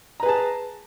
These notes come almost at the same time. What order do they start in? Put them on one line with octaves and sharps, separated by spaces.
A#5 B4 G#4 A5